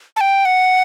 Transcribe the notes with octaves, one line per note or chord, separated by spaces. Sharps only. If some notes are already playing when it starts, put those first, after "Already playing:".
A5
G5
F#5